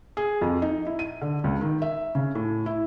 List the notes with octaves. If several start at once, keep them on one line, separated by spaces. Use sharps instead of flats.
G#4
F2
D#4
E4
D#7
D3
C#2
D#3
E5
C#3
A2
E4